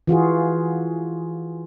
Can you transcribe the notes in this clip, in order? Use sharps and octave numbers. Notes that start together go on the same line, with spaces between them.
E3 F4 F#4 G#4